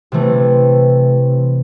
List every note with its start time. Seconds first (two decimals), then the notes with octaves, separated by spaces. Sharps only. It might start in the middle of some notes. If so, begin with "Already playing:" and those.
0.12 C3 E3 A3